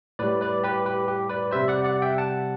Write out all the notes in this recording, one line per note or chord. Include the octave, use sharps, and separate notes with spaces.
A2 G3 B4 D5
B4 D5
G4 B4
G4 B4
G4
B4 D5
C3 G3 C5 E5
D5 F#5
D5 F#5
E5 G5
F#5 A5